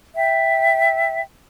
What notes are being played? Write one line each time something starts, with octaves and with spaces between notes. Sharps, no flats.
E5 G5